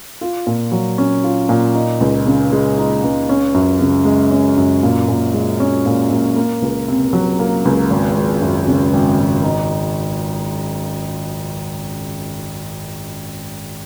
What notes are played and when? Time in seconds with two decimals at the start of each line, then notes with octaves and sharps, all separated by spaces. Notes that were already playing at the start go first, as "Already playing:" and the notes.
0.21 F4
0.47 A#2
0.72 F#3
0.98 C#4
1.24 F4
1.49 A#2
1.74 D#4
2.00 C#2
2.26 C#3
2.52 G#3
2.78 D#4
3.04 C#2
3.29 C#4
3.54 F#2
3.80 C#3
4.05 G#3
4.31 C#4
4.57 F#2
4.83 A#2
5.08 A#2
5.34 G#3
5.60 C#4
5.86 A#2
6.10 A#2
6.36 A#3
6.62 C#2
6.88 C3
7.13 F#3
7.39 A#3
7.65 C#2
7.90 G#1
8.16 G#1
8.42 F#2
8.68 C#3
8.93 G#1
9.18 G#1
9.44 D#4